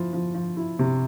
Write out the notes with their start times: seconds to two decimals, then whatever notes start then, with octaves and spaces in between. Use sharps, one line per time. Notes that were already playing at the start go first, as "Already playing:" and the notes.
Already playing: F3 E4
0.13 F3
0.34 F3
0.57 E4
0.79 C3